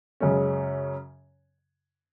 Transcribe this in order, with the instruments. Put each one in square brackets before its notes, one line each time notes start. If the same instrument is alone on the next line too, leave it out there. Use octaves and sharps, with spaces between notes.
[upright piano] F#2 C#3 G#3 C#4